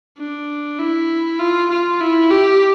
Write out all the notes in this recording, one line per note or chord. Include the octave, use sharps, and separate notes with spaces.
D4
E4
F4
F4
E4
G4